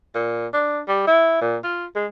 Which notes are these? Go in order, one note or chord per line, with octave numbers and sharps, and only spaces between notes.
A#2
D4
G3
E4
A#2
F4
G#3